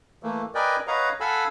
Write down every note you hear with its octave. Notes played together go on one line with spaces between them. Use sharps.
E3 A3 A#3
A#4 B4 D5 D#5 G5 G#5
B4 C#5 D#5 F5 F#5 A#5
A4 F5 F#5 G#5 B5 E6